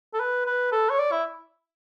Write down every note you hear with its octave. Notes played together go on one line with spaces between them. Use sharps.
A4
B4
B4
A4
C#5
D5
E4